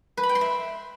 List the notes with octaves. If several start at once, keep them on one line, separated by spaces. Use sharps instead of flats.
B4
B5
G5
C6
E5